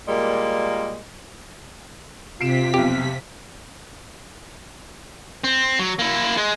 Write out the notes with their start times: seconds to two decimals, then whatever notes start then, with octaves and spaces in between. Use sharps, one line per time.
0.07 A#2 G3 G#3 A#3
2.41 C3 F4 B6 C7 D7 E7
2.74 B1 F2 G4
5.44 C4
5.79 F#3
5.99 A#3 E4
6.37 G#3